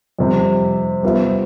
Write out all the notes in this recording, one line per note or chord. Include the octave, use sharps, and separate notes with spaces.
F2 C3 G3
G3 B3 F4 C5 E5